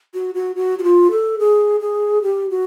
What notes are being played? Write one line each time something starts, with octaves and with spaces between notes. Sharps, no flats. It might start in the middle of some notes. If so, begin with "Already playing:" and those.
F#4
F#4
F#4
F#4
F4
A4
G#4
G#4
G4
F#4